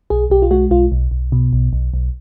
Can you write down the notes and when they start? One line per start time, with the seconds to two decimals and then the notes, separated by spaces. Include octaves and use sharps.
0.10 B1 G#4
0.30 B1 G4
0.42 F4
0.51 G#3 F#4
0.71 B1 F4
0.92 B1
1.11 B1
1.32 B2
1.53 B1
1.73 B1
1.94 B1